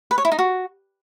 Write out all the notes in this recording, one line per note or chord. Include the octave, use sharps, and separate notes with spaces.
B4
C#5
E4
D#4
F#4